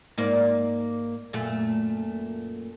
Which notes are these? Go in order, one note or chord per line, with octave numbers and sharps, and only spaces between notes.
G#2 A#3 D5
F#2 A#2 A3